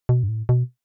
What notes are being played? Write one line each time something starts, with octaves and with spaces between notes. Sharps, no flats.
B2
G2
A2
B2